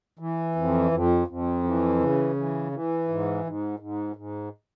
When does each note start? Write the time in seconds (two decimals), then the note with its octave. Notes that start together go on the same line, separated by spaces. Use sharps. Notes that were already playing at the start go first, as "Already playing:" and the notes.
0.19 E3
0.55 F2
0.91 F2
1.27 F2
1.64 E3
1.99 C#3
2.36 E3
2.72 E3
3.08 G#2
3.44 G#2
3.79 G#2
4.16 G#2